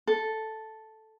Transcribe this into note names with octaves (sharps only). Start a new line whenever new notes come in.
A4